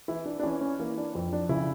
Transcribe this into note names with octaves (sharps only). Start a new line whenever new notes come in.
E3 E4
D4
D4
E3 C#4
C#4
E3 A#3
D4
F2
D4
C#3 E4